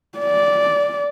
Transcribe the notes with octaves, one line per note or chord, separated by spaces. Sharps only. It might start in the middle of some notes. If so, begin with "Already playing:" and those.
D5